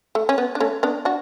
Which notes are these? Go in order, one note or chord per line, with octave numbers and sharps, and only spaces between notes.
A3
C#4
B3
D4
A3 C#4
B3 D4
D4 F#4